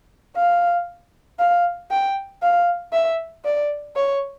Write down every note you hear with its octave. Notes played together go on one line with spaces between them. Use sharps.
F5
F5
G5
F5
E5
D5
C#5